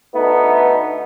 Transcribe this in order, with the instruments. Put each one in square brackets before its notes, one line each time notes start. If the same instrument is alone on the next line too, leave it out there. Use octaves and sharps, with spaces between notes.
[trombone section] D2 A3 B3 D#4